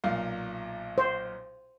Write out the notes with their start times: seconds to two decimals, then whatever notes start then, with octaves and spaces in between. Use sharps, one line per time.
0.04 B1 A#2 F5
0.98 C5